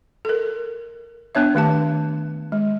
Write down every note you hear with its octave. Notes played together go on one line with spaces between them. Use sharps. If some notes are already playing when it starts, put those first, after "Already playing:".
A4 A#4
B3 D4 C#5 E5
D#3 A3 G4 A5
G#3